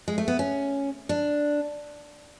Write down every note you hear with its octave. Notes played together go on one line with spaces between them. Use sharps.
G#3
A3
B3
C#4
D4